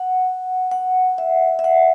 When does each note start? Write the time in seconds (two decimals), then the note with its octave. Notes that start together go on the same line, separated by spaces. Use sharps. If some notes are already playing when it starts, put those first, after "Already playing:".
Already playing: F#5
0.71 F#5
1.18 E5
1.59 E5
1.64 F#5